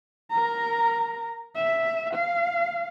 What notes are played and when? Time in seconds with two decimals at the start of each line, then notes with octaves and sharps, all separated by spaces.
0.31 A#4 A#5
1.56 E5
2.14 F5